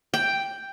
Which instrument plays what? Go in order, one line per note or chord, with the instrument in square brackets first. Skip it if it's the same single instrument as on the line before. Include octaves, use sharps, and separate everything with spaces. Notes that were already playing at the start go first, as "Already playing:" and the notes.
[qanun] G5